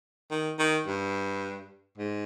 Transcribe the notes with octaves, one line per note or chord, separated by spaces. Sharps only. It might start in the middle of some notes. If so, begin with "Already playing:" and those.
D#3
D#3
G2
G#2